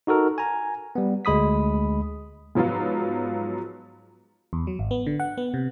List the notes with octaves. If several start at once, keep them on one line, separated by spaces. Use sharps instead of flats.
D#4 F#4 A4 A#4
G#5 A#5
G3 B3
D2 G#3 B5 D#6 B6
G#2 F3 F#3 B3 F4
E2
F#3
G#1
B3
D3
F#5
B3
C3